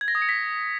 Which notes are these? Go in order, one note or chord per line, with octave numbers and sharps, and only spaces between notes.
G#6
A#6
D#6
C#7
B6